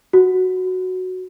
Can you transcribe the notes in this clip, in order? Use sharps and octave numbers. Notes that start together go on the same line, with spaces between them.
F#4